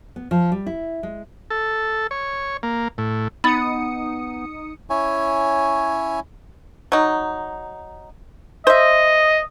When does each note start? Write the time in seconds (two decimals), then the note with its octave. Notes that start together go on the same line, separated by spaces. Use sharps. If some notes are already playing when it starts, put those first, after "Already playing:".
0.16 B3
0.31 F3
0.52 G3
0.66 E4
1.03 G#3
1.50 A4
2.11 C#5
2.63 A#3
2.98 A2
3.44 B3 D#4 B5 D#6 A6 C#7
4.90 C#4 E4 C#5 G#5
6.92 F#3 D#4
8.67 C5 D#5 E5